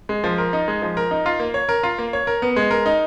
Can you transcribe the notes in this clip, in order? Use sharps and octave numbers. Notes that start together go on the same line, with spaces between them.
G#3
F3
A#4
D#4
G#3
F3
A#4
D#4
F4
A#3
C#5
A#4
F4
A#3
C#5
A#4
B3
G#3
A#4
D#4